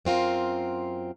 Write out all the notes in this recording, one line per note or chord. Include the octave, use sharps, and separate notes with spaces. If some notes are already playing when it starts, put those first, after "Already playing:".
F#2 C4 F4 A#4